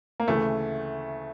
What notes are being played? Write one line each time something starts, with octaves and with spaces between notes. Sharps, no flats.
A#3
D2 C#3 E3 A3